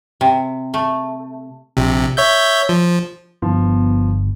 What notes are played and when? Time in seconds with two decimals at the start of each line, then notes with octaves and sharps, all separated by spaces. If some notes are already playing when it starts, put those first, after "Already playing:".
0.21 C3
0.74 A3
1.77 A#1 C3
2.17 C#5 E5 G6
2.69 F3
3.42 G1 F3 B3